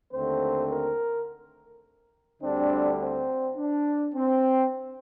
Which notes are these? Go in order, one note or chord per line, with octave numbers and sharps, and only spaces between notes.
D#2 D3 A3 C4 C5
A#4
D2 D3 G3 C4 D4
C4
D4
C4